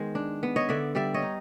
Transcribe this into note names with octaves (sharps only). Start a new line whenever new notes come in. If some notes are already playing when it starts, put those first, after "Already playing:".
Already playing: D#3 G#3 B3 C5
D4
B3
C#5 D#5
D3 D5 E5
G3 D5 E5
C#5 D#5
D#4